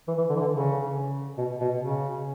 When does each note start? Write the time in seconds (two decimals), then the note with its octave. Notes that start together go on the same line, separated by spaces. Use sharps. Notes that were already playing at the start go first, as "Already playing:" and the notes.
0.08 E3
0.18 E3
0.29 D3
0.36 E3
0.40 D3
0.52 C#3
1.37 B2
1.60 B2
1.81 C#3